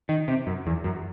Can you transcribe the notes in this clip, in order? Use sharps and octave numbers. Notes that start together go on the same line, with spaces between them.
D#3
C3
F#2
E2
F#2